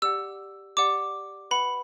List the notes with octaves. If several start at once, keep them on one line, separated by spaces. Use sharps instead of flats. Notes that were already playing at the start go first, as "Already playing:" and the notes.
G4 D5 F#5 E6
G4 D5 F#5 D6
B4 F#5 B5